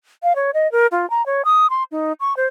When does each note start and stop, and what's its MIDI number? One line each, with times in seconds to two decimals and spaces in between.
0.23 0.36 77
0.36 0.51 73
0.54 0.70 75
0.72 0.87 70
0.92 1.09 65
1.10 1.25 82
1.26 1.42 73
1.45 1.70 87
1.70 1.84 84
1.91 2.13 63
2.20 2.36 85
2.37 2.47 72